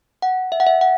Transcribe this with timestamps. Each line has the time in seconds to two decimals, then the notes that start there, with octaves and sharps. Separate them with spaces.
0.22 F#5
0.52 E5
0.60 F#5
0.67 E5
0.81 F#5